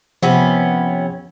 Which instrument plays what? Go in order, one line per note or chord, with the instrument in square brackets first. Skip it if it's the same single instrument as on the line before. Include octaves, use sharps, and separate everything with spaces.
[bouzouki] C3 B3 C#4 [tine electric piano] F3